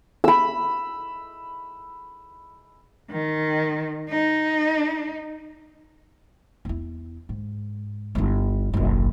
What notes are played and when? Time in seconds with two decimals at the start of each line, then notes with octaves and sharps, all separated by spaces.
0.24 B5 E6
3.11 D#3
4.10 D#4
6.65 E2 E4
7.29 G#2
8.15 G1 E4
8.73 F#1 B1